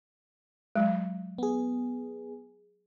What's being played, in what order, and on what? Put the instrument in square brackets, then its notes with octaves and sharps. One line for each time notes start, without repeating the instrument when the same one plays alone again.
[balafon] F#3 G#3
[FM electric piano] B3 G#4